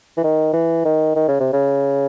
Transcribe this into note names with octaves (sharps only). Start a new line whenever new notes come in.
E3
D#3
E3
D#3
D#3
C#3
C3
C#3